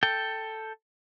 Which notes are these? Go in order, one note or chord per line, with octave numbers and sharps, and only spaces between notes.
A4 G5